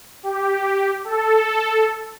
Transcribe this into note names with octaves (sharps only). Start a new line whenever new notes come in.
G4
A4